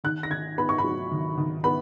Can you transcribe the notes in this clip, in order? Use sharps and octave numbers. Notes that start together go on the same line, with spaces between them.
D#3 F#6
A#6
D#3 G#6
B3 B5
C#6
B5
F#3
D#3
D#3
B3 B5